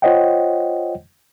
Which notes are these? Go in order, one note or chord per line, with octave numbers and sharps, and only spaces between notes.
F4 C5 C#5 D#5 F#5 G5